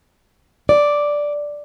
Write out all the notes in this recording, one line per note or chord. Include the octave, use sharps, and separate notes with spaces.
D5